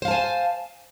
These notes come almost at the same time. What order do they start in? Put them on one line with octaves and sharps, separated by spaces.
C5 F5 A5 G#5